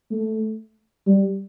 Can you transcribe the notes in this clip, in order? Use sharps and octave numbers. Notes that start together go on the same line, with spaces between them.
A3
G3